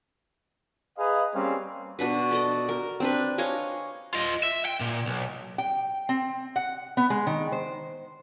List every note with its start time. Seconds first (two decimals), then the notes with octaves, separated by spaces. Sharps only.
0.98 G#4 B4 D#5 F5 A#5
1.34 G3 A#3 C4 C#4 F5
1.99 B2 D4 F#4 B4
2.31 A4 D5 D#5
2.69 A#4
3.00 C4 D4 B4
3.38 C#5 D#5 F5 G#5
4.14 F4 D#5
4.43 E5
4.65 G5
4.80 A#2
5.06 B1
5.58 G5
6.09 C4
6.56 F#5
6.97 B3
7.10 G#3
7.27 D#3
7.52 C5